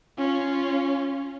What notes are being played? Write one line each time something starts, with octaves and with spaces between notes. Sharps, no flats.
C#4 F4